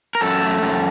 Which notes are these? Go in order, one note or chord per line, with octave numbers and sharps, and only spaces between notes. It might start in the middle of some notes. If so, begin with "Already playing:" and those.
A#4
F#2 A4
A3
F#2